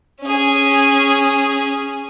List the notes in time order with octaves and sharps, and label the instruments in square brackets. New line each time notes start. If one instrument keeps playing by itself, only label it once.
[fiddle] C#4 G#4